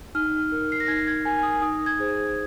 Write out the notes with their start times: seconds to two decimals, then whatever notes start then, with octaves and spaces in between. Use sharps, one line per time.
0.15 D#4 F6
0.52 A#4
0.72 C7
0.80 A#6
0.88 D#4 G#6
1.07 G#6
1.25 A#4 G#5
1.43 D#6
1.62 D#4 D#6
1.86 G#6
1.99 G#4 C5